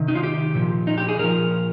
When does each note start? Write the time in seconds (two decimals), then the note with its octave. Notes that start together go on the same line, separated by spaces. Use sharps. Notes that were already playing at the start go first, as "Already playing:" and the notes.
Already playing: C3 D#3
0.08 D#4
0.15 F4
0.23 G4
0.55 A#2 F3
0.87 D#4
0.98 G4
1.09 G#4
1.19 A#2 F3 A#4